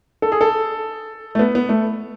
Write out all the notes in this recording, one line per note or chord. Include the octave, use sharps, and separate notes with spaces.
A4
G#4
A4
A3
B3
B3
A3